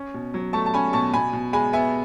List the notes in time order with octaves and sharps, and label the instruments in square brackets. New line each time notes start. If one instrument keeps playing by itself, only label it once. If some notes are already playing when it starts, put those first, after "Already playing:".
Already playing: [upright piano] C#4
B2
F#3
A3 A5 C#6
A5
C#4 G#5 B5
B2 A5 C#6
B2 G#5 B5
B2
G#3 G#5 B5
B3 E5 G#5